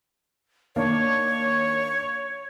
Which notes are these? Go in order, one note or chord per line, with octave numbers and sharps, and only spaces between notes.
D#3 A#3 D4 C#5